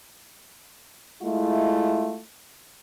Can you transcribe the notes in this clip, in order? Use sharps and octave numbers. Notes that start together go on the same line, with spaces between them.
G#3 A3 E4 F4